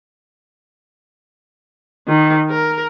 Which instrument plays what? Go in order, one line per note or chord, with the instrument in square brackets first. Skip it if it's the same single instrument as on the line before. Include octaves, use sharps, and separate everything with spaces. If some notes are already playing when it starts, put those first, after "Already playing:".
[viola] D#3
A#4